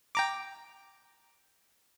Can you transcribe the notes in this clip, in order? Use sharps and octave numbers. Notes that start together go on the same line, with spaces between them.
G5 A#5 D6